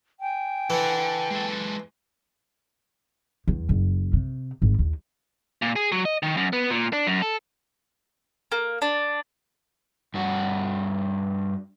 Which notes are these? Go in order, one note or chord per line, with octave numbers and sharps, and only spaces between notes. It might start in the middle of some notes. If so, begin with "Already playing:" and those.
G5 G#5
E3 A4 F#5
G#3 A4
E2
F#1
C3
G#1
D#2
A#2
G#4
F#3
D#5
D#3
F#2
B3
A#2
D4
F#2
A4
A#3
D4
G2 F#4